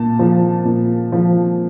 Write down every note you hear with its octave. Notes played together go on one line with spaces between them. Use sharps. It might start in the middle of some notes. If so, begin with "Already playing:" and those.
Already playing: A#2 A5
F3
A#2
F3